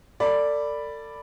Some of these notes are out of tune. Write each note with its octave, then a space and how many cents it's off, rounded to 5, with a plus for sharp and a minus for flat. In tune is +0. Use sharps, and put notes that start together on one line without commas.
A4 +40 D5 +0 B5 +0